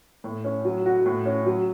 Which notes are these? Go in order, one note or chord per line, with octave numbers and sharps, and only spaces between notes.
A2
C#4
F#3
F#4
A2
C#4
F#3